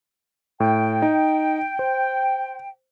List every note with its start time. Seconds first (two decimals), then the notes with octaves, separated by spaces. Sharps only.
0.60 A2 G5
1.02 D#4
1.79 C5